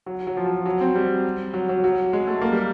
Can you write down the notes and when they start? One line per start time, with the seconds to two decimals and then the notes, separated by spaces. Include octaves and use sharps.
0.06 F#3
0.27 F#3
0.37 F3
0.46 F#3
0.55 F3
0.66 F#3
0.81 C4
0.95 G3
1.53 F#3
1.69 F#3
1.84 F#3
2.13 G#3
2.27 A3
2.41 A#3
2.52 G3